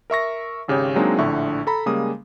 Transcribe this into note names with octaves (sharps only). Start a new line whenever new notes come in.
A#4 E5 C#6 A#6
G#1 C#3 G4 C#5
F#3 G#3 A#3 C4 D4 D#4
A#1 A2 D3 E5 C#6
A4 A#5 B5
C#3 G3 G#3 A#3 D#6